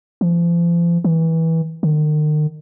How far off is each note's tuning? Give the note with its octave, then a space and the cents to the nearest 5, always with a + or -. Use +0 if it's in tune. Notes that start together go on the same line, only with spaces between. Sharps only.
F3 -40
E3 -20
D#3 -40